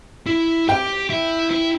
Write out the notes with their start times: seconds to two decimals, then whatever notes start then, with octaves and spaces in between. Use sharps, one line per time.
0.26 E4
0.68 G4 G5
1.10 E4
1.51 E4